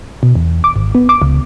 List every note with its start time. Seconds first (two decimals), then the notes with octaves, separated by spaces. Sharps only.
0.23 B2
0.35 E2
0.64 D6
0.76 G#1
0.95 B3
1.09 D6
1.22 C#2